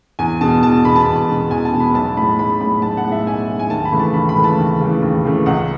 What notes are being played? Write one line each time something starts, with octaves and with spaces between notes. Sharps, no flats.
E2 G#5
B2 G#3 A5
E2 A5
B2 G#3 B5
A5
E2
B2 G#3
E2 G#5
A5
B2 G#3
B5
B1 A5
A2 G#3 B5
B1 B5
A2 G#3 B5
B1 A5
F#5
A2 G#3
E5
B1 G#5
A2 G#3
G#5
D#2 A5
B5
C#3 E3 A3
A5
D#2 B5
B5
C#3 E3 A3
A5
D#2
C#3 E3 A3
D#2
C#3 E3 A3
C#2 F#5